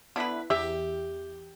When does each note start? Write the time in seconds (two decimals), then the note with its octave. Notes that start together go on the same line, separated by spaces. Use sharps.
0.16 D3 B3 E4 B4 B6
0.50 E2 G4 E5